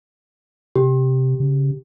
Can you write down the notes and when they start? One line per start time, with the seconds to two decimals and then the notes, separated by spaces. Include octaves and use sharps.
0.76 C3 G4
1.40 C#3